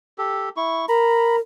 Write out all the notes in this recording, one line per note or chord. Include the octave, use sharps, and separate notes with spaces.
G4 A4
E4 C#6
A#4 A#5 B5